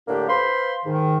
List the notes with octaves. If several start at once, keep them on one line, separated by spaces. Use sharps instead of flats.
A2 D3 A#3 D4 G4
B4 C5 F5 B5 C6
G#2 D#3